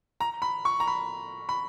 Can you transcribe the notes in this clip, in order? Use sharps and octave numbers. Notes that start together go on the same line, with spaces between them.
A#5
B5
C#6
A#5
B5
B5